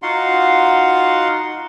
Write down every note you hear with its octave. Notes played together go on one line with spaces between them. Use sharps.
D#4 F4 F#4 F5 F#5 C6